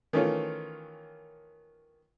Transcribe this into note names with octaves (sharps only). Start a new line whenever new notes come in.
D#3 E3 A3 C#4 F4